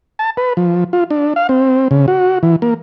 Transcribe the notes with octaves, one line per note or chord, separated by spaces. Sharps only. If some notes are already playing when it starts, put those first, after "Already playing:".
A5
B4
F3
F4
D4
F5
C4
C#3
F#4
E3
A#3